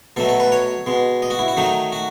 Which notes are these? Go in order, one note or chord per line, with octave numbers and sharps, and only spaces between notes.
B2 F#3 A3 A4
A4
B4
C#5
B2 G#3
D#5
F#4
E4
F#4
D#3 F#3 A3 D#4
F#4